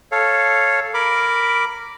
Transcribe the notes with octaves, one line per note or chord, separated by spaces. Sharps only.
A4 C#5 F5
A#4 B5 D6